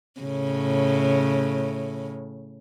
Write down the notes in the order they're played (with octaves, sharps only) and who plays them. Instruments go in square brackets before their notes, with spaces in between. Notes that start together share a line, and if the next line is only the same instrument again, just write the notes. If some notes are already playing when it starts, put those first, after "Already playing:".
[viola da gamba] A2 C#3